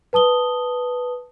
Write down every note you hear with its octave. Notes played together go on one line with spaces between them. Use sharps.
B4 A5 D#6 G7